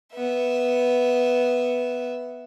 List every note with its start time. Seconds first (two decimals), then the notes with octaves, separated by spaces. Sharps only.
0.15 B3 E5